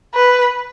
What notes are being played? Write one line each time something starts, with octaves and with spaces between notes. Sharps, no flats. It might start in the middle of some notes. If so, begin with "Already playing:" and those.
B4